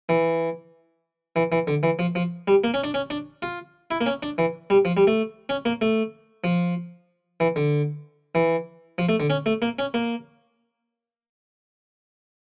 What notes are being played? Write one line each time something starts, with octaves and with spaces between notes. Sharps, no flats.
E3
E3
E3
D3
E3
F3
F3
G3
A#3
C#4
D4
C#4
D4
F4
E4
A#3
C#4
D4
E3
G3
F3
G3
A3
C#4
A#3
A3
F3
E3
D3
E3
F3
A3
D3
C#4
A3
A#3
C#4
A#3